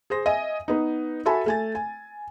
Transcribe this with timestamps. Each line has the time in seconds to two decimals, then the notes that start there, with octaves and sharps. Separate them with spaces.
0.10 G#4 C5 A#6
0.26 D#5 E5 G#5
0.68 B3 D#4
1.26 F#4 A4 E5 G#5 A5 B5
1.46 A3 G#5 A6
1.75 G#5